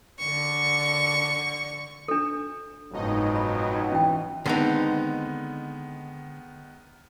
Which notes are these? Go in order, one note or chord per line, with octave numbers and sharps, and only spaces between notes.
D3 C#6
D4 A4
F#1 F2 G#2 B2 F#3 D#4 D#5
B5
E3 C#4 G5
D3 D#3 G#3 B3 C4 D#4